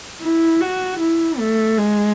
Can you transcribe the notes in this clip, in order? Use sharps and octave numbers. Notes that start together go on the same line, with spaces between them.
E4
F#4
E4
A3
G#3